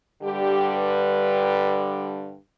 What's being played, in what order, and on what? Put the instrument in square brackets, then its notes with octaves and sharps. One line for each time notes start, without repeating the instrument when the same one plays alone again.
[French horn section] G2 D3 G3 G4
B4